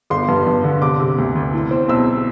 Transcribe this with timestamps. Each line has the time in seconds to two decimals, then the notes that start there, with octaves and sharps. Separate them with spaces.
0.10 G1 C6
0.28 G2
0.47 G2
0.64 D3
0.82 C3 D6
1.00 C3
1.18 D2
1.35 D2
1.54 A2
1.71 C4
1.89 B1 E6